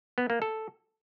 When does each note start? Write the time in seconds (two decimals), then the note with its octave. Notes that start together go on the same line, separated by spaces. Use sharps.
0.18 B3
0.30 A#3
0.42 A4